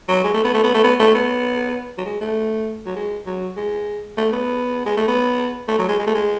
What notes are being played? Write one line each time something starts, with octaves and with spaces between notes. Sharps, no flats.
F#3
G#3
A3
B3
A3
B3
A3
B3
A3
B3
F#3
G#3
A3
F#3
G#3
F#3
G#3
A3
B3
G#3
A3
B3
A3
F#3
G#3
G#3
A3
G#3